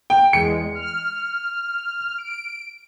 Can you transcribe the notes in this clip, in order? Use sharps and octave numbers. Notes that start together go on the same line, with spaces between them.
G5
E2 G#3 C#7
F6
D7